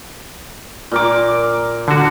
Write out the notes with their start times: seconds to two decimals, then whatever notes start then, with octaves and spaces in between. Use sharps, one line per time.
0.92 A#2 A#4 D6
1.88 D3 F#4